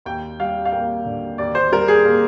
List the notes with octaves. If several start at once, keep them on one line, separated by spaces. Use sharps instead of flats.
D#2 G5
G3 F5
F5
A#3 G5
D3
D#2 D5
C5
G3 A#4
G#4
A#3